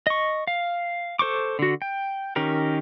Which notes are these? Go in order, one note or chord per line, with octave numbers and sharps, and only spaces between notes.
D#5 C#6
F5
A4 C5 C#6 D6
D3 F#4
G5
D#3 C#4 G4 A#4